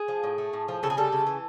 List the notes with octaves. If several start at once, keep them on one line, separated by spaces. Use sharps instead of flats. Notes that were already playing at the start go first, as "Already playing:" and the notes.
Already playing: G#4
F3
A2
A3
A2
F3
C#3 A4
G#4
G3 A4
C#3
E3